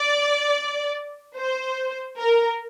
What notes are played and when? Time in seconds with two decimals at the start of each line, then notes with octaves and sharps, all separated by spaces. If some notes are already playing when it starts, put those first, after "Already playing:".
Already playing: D5
1.36 C5
2.18 A#4